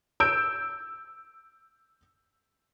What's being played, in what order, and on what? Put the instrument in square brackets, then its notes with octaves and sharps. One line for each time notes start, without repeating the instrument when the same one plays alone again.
[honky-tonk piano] E6 G6 D7